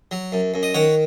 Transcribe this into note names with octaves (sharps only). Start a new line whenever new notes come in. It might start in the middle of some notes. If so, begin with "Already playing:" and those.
F#3
F#2
F#2
D#5
D#3 C#5 F#5